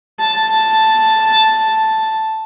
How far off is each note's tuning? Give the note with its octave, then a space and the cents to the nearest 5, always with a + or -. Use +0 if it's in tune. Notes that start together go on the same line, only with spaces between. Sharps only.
A5 +0